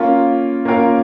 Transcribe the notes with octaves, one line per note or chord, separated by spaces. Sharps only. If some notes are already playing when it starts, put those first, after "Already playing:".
Already playing: A#3 C#4 F4 A#4 F5
A#3 C#4 F4 A#4 F5